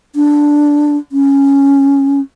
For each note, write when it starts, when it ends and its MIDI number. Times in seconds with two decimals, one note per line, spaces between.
0.16 0.97 62
1.12 2.20 61